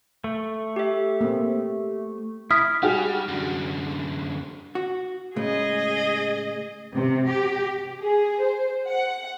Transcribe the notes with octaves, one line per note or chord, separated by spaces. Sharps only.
A3
G4 E5
A#3 C4
E4 D#6 F6 B6
G3 F#4 G#4 F6
F#2 D3
F#4
A2 C#3 G#3 G#4 D#5
C3
G4
G#4
C5
F#5